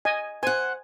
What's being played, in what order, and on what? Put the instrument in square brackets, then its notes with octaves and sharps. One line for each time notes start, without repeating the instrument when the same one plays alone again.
[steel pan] D#5 G#5
[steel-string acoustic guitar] C5 F#5 [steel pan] G#5